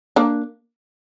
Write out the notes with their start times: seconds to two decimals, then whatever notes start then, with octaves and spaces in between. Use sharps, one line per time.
0.16 A#3 D4